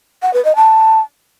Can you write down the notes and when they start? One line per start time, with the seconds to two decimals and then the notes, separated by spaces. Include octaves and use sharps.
0.22 F#5
0.33 B4
0.45 D#5
0.56 A5